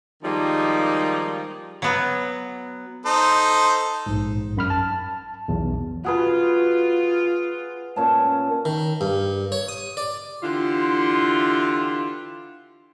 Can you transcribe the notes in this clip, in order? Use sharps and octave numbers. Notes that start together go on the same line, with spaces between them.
D#3 F3 G3 G#3 A#3 D#4
F#3 B3
D#4 A4 C5
A#1 G#2
F#2 B5 F6
A5
B1 E2
F4 F#4 G#4 B4
A#2 C#4 A5
D#3
G2
C#5
D#6
D5
D3 E3 E4 F4 G4 C6